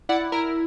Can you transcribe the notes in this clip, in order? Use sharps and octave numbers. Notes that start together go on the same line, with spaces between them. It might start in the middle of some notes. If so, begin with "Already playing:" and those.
E4 D5 F#5
E4 A#4